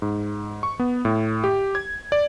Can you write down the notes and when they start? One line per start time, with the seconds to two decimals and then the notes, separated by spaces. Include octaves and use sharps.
0.02 G#2
0.63 C#6
0.79 B3
1.05 A2
1.44 G4
1.75 G#6
2.12 D5